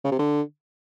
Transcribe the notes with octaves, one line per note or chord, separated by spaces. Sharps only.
C#3
C3
D3